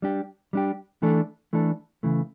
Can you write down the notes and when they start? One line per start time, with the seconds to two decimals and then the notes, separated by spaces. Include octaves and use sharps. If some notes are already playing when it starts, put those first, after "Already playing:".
0.02 G3 D4 G4
0.53 G3 D4 G4
1.02 E3 A3 D4 A4
1.53 E3 A3 D4 A4
2.03 C#3 E3 A3